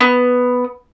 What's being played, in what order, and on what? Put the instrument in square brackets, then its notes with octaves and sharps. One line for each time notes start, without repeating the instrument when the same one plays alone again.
[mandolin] B3